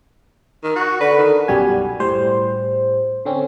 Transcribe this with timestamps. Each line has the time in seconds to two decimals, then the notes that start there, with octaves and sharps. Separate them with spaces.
0.63 D#3
0.76 F#4
1.00 D3 B4
1.18 D#3
1.48 B1 F#2 G3 F#4 G#5
2.00 A2 G3 C5
3.25 D3 C4 C#4